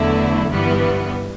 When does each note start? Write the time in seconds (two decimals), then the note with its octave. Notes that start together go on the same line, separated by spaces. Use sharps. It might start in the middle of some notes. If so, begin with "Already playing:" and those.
Already playing: E2 D3 F#3 A3 E4
0.49 G1 G2 E3 G3 B3